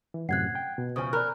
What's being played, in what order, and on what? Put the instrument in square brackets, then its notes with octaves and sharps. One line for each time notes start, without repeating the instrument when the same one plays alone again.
[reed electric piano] E3
[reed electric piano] F#2 A2 C3 [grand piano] F#5 [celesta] F#6 G#6 C7
[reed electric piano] G5
B2
[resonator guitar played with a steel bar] C#3 F3 [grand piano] C5 G#5 [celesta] D#6
[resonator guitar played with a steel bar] A#4 [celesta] D5 B5 F#6